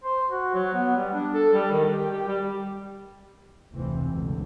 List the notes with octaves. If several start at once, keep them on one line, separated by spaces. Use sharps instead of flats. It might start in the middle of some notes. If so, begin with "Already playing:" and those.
C5
F#4
F#3
B3
G3
D4
A4
G3
D#3
G4
G4
G3
F1 D2 C3 E3 C4
C#2 G2 B2 D3